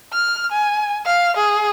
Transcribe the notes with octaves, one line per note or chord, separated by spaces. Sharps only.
F6
G#5
F5
G#4